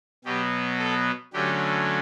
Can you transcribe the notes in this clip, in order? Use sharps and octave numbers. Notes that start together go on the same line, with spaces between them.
B2 F#3 B3 G4
A4
D3 F#3 A3 C#4 G4